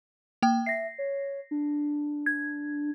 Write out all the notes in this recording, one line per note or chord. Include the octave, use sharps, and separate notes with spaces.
A#3 G5
E5 A#6 C7
C#5
D4
G#6